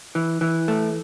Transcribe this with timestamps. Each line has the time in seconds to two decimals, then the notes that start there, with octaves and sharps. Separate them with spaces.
0.15 E3
0.41 E3
0.68 A3